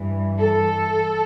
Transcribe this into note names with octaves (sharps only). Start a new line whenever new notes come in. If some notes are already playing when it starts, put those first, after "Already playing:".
Already playing: G2 E3
A4